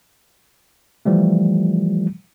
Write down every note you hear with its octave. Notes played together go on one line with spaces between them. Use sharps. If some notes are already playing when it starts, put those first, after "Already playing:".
E3 F3 G3 A3